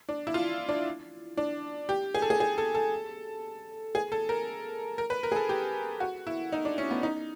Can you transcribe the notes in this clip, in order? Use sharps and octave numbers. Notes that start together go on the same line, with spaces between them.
D4
E4
F4
D4
D4
G4
G#4
A4
G#4
G#4
A4
A4
G#4
A4
A#4
A#4
B4
A#4
G#4
A4
G4
F#4
E4
D#4
D4
C#4
B3
D#4